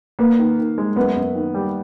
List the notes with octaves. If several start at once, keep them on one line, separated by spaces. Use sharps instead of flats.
A#3 B3
D#3
D#3
G#3
F#2 B3
F#2
D#3
G3